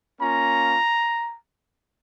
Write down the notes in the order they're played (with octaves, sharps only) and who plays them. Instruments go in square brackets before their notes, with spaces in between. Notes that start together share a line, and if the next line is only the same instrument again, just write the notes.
[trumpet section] A#3 C#4 F4 A#5